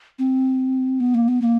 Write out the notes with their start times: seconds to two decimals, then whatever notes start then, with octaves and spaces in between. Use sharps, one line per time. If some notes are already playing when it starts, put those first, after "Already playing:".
0.19 C4
1.00 B3
1.14 A#3
1.28 B3
1.42 A#3